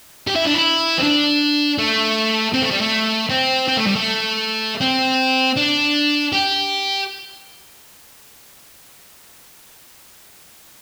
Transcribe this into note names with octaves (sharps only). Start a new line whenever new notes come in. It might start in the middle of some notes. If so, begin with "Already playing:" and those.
G4
E4
D4
E4
C4
D4
A3
C4
A3
G3
A3
C4
C4
A3
G3
A3
C4
D4
G4